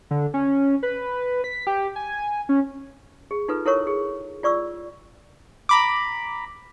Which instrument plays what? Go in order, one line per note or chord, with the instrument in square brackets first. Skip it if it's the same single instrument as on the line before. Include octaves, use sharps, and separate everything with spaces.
[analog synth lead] D3
C#4
B4
B6
G4
G#5
C#4
[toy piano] G#4
D#4 F4 A4 B4
E4 A4 A#4 C#5 C#6
G#4
F4 D5 C#6 E6
[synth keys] A#5 B5 D6